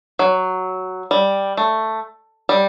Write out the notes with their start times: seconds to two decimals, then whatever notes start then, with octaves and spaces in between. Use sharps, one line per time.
0.19 F#3
1.11 G3
1.57 A3
2.49 G3